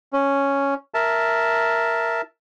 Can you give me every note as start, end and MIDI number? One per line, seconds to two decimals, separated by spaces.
0.13 0.74 61
0.94 2.21 70
0.94 2.21 76
0.94 2.21 81